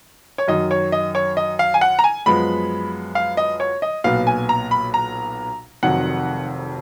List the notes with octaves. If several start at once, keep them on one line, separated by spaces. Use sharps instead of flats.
C#5
F#2 D#3 F#3 D#5
C#5
D#5
C#5
D#5
F5
G#5
F#5
A#5
G#5
F#2 F3 G#3 B3 B5
F5
D#5
C#5
D#5
B1 A#2 F#3 B3 F5
G#5
A#5
B5
A#5
F1 F2 D#3 F#3 F#5